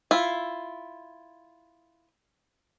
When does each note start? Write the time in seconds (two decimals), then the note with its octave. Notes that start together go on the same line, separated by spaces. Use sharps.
0.11 E4 F4